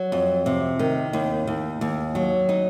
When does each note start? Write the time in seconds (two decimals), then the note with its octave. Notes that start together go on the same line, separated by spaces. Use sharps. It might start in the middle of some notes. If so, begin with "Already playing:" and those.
Already playing: F#3
0.12 F2
0.46 C3
0.79 D#3
1.13 D#2
1.47 D#2
1.81 D#2
2.15 F#3
2.49 D#4